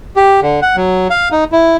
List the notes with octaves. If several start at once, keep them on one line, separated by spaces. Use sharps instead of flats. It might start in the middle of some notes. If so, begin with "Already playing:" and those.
G4
D3
F#5
F#3
F5
D#4
E4